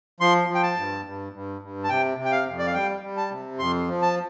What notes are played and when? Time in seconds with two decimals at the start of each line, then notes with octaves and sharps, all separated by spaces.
0.20 F3 C6
0.49 F3
0.55 G5
0.63 A5
0.77 G2
1.05 G2
1.33 G2
1.62 G2
1.84 A5
1.89 C3 G5
2.18 C3
2.25 G5
2.31 F5
2.47 F2
2.59 D5
2.66 F5
2.74 G3 G5
3.03 G3
3.17 A5
3.30 C3
3.59 F2 C6
3.88 F3
4.02 A5